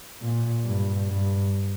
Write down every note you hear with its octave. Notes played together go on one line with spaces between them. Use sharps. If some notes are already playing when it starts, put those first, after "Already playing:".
A#2
G2
G2